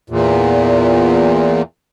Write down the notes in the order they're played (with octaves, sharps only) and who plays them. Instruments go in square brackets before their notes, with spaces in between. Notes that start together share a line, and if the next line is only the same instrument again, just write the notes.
[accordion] E2 A#2